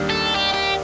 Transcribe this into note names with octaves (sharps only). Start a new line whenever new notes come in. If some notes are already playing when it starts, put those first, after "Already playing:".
Already playing: D#2 D#3 G3 D4
A4
G4
G4